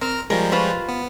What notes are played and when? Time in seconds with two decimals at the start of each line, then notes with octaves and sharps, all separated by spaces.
0.01 C4 A#4 F6
0.30 F3 G3 G#3 A#4
0.52 F4 B4 C5
0.88 B3